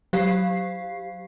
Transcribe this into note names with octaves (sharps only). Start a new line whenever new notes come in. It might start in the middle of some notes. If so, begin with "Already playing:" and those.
F#3 G4 F5 C7